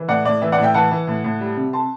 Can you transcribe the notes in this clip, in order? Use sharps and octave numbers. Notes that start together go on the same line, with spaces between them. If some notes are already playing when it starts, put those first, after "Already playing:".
Already playing: E3
A2 D5 F#5
A2 D5
E3 E5
D5 F#5
A2
E5 G5
E3 F#5 A5
E3
A2
A2
G3
C3
A5 C6